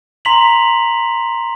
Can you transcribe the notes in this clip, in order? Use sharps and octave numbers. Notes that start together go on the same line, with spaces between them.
A#5 C6 B6 F7 F#7